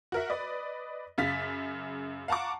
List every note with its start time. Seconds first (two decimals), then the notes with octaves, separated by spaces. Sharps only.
0.12 F#4 A#4 E5
0.30 B4 D5 D#5
1.18 F#2 C#3 F5 A6 B6
2.28 F5 F#5 A5 A#5 C#6 D6